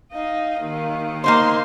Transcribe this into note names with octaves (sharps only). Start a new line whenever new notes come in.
D#4 D#5 F5
D#2 D#3
A#3 D#4 C5 C6